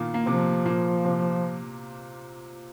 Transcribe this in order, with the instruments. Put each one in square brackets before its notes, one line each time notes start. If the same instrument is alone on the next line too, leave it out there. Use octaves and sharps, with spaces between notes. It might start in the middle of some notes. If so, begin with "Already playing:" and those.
Already playing: [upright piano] A#2 D#3 A#3 D#4
A#3
[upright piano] C3 C4 [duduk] F3
[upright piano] A#2 A#3
C3 C4